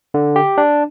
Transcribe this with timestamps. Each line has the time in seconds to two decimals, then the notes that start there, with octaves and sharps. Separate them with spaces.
0.14 D3
0.36 G4
0.58 D4